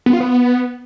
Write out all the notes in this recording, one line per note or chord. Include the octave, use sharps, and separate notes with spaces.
B3
F4
B3